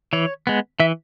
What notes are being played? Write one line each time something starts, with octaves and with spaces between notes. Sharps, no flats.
E3 C#5
G#3 B3
E3 E5